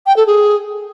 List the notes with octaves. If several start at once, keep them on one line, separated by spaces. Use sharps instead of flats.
G5
A4
G#4